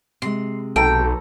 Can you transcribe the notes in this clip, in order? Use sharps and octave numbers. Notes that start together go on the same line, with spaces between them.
C3 G#3 C6
B1 A4 G5 A#5